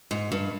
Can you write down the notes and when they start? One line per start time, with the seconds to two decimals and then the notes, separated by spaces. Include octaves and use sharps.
0.11 G#2
0.32 G2